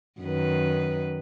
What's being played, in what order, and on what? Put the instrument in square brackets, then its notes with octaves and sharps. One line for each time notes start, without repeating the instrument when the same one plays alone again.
[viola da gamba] F#2 D#3 B4